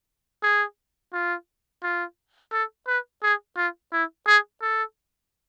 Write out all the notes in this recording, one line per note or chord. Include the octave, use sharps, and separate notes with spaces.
G#4
F4
F4
A4
B4
G#4
F4
E4
G#4
A4